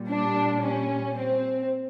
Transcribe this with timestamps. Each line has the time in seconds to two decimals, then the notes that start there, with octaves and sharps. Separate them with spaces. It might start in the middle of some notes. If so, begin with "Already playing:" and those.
Already playing: A#2 G3
0.09 D4
0.63 C#4
1.16 C4